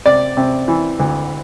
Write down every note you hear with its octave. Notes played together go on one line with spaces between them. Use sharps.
C3 D5
C3
E3
D2